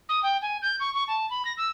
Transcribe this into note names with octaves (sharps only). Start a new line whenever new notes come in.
D#6
G5
G#5
G6
C#6
C#6
A5
B5
A#6
E6